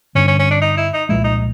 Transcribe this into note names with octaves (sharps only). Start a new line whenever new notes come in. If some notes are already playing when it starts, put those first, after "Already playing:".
G2 D3 G3 C4 C#4
C#4
C#4
D4
D#4
E4
D#4
C2 A#2 F3 G#3 E4
D#4